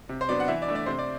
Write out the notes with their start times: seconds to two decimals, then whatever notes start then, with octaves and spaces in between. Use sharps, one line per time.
0.09 C3
0.21 C5
0.29 F#3 B3 D4 D5
0.40 F#5
0.48 E3 E5
0.62 D5
0.68 A3 D4
0.75 D5
0.86 C3 C5
0.99 D5